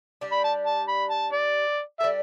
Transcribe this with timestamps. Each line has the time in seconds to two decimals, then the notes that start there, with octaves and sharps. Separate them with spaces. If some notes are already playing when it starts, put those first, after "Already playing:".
0.21 G3 D4 G4
0.32 B5
0.44 A5
0.66 A5
0.88 B5
1.10 A5
1.33 D5
2.00 G3 D4 A4 E5